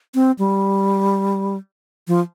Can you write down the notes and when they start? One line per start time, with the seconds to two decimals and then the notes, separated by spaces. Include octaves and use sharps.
0.15 C4
0.39 G3
2.08 F3